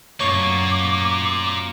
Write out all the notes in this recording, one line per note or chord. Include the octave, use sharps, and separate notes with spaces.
F#2 A3 A#3 F4 C#5 C#6 D6